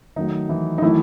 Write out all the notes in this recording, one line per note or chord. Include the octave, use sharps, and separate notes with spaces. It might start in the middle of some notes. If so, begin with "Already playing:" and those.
D#3 F#3 A3 D#4
E3 E4
D#4
D#3 E3 F#3 A3 E4